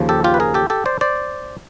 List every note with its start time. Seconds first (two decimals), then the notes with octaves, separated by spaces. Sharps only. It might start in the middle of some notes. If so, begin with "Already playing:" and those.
Already playing: D#2 C#3 F3
0.09 G4 A4
0.24 F4 G4
0.34 B4
0.40 G#4 A#4
0.54 G4 A4
0.70 G4 A4
0.86 C5 D5
1.01 C5 D5